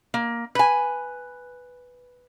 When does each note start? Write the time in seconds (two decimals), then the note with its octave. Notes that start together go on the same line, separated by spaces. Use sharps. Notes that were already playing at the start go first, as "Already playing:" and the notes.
0.14 A#3
0.55 B4 G#5